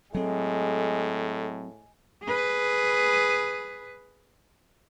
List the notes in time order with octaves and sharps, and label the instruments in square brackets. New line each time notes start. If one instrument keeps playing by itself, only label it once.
[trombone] A2 [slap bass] F#3 C4 [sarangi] G#3 [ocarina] A4
[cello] G#4 B4